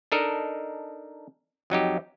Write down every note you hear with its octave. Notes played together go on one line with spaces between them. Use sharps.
D4 D#4 A4 A#4 D#5
F2 F#3 D#4 G4